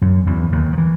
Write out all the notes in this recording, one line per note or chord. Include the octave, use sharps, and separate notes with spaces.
F#2 F#3
E2 E3
D#2 D#3
F3
E3